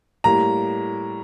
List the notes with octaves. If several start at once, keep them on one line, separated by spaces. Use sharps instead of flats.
A2 G3 A#3 A#5